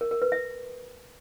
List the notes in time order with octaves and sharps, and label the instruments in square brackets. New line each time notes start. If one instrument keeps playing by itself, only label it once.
[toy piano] A#4
A#4
B4
E5